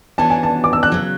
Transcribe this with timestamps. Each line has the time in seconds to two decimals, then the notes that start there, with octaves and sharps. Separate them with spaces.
0.18 E3 B3 D4 F#4 C#5 A5
0.30 G#5
0.43 A5
0.64 D6
0.73 E6
0.83 F#6
0.92 C#3 F#3